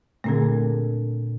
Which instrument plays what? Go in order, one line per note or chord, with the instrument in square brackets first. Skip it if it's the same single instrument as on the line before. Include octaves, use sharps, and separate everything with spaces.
[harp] A#2 D3 G#6 [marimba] A3 C4 G#4